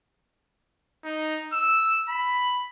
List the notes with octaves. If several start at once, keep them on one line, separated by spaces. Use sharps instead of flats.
D#4
E6
B5